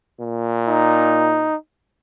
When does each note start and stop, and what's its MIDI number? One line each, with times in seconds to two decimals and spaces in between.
0.20 1.53 46
0.67 1.55 63